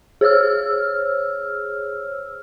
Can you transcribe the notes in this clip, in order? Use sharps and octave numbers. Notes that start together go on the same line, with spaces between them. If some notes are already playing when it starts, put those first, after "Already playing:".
G#4 C5 C#5 E6 F6